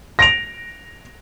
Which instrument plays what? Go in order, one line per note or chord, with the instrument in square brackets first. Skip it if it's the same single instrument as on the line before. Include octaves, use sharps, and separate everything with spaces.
[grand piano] A#6 D7 F7